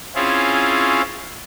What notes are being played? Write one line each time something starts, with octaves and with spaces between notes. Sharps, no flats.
C4 C#4 E4 F4 G#4